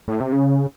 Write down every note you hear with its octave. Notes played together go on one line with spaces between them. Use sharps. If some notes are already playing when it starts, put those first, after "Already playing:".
A2
C3
C#3